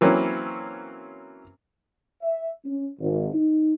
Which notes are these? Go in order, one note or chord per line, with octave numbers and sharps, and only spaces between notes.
E3 F#3 A#3 C4 C#4 E4
E5
C#4
G#1
D#4